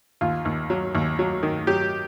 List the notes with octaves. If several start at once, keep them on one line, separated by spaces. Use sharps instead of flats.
D#2 F4
D#2
F#3
D#2
F#3
D#3
F#3 G4